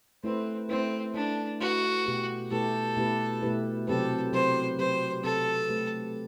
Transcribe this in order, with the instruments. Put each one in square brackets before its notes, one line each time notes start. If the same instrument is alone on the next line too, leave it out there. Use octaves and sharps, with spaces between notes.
[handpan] A3 E4 B4 [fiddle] C4
[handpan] A3 E4 B4 [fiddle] C4
[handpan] A3 E4 B4 [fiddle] D4
[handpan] A3 E4 B4 [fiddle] F#4
[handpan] B2 A3 E4 G4 B4
[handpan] B2 A3 E4 G4 B4 [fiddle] A4
[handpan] B2 A3 E4 G4 B4
B2 A3 E4 G4 B4
[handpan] C3 F#3 C4 G4 B4 [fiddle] A4
[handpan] C3 F#3 C4 G4 B4 [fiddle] C5
[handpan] C3 F#3 C4 G4 B4 [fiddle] C5
[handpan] C3 F#3 C4 G4 B4 [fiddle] A4
[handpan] A3 C4 G4 B4